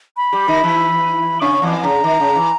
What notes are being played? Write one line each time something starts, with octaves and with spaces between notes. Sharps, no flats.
B5
G3 G4
D#3 D#4
E3 E4
C#3 C#4 C#6
E2 E3
C#3 A#5
D#3
C#3
E3